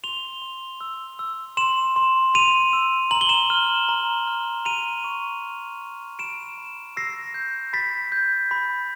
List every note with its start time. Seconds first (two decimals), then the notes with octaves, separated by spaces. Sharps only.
0.04 C6 F7 G7
0.42 C6
0.81 E6
1.19 E6
1.57 C6 E7 F#7
1.96 C6
2.34 C6 D#7 F7
2.73 E6
3.11 A#5 F#7
3.21 G7
3.29 E7 F#7
3.50 F6
3.89 A#5
4.27 F6
4.65 A#5 D#7 F7
5.04 C#6
5.42 F6
5.81 F6
6.19 B5 D7 E7
6.58 B5
6.97 E6 A#6 C7
7.34 G6
7.73 B5 A6 B6
8.12 G6
8.51 B5